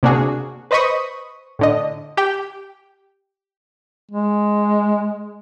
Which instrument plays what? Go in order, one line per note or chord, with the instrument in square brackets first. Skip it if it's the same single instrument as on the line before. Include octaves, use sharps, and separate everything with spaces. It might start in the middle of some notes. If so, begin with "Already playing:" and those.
[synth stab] C3 A#3 D4 F#4 G#4
B4 C5 D#5 B5 C#6 D#6
A2 D3 D#5
G4 G5
[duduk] G#3